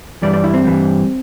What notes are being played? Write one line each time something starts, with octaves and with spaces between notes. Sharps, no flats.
G2 E3 G3 D5
D5
E4
C4
G2 E3 G3